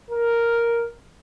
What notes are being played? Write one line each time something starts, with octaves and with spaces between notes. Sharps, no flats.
A#4